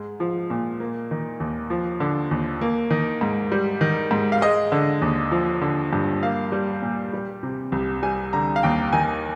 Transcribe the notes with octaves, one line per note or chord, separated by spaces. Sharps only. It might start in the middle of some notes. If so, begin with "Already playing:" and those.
Already playing: G#2 G#3
F3
A#2
A#3
D#3
D#2
F3
D3
D#2
A#3
D#3
G#2
G3
D#3
G#2
F5
G#3 D#5
D3
D#2
F3
D3
G2
A#3 F5
G3
A#2
G3
C3
C2
G3 G#5
D3 A#5
F5
D#2 G5
D#3 G#5